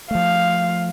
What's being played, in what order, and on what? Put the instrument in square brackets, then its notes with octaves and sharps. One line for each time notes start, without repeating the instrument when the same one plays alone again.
[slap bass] F3 A3 [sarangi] F5